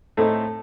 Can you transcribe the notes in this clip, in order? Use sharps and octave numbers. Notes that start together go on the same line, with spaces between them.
A2 A3 C4 D#4 A4